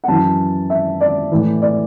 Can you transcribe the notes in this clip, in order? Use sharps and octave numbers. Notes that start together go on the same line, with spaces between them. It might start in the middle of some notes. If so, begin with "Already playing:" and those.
F#5
F#2 E3 A5
E5
D5
A2 E3
D5